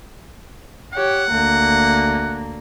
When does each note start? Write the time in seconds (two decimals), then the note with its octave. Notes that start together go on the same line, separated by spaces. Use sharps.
0.93 G4 C#5 F#5
1.30 D2 A#3